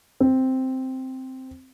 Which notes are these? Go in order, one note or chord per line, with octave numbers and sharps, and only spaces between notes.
C4